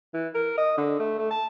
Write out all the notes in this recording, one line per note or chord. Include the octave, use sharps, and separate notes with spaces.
E3
A#4
D#5
D3
A3
A3
A5